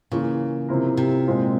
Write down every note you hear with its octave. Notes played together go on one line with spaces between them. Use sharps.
C#3 E3 A#3 F4
C3 F3 C4 E4 A#4
C3
A#2 G#3 C4 F4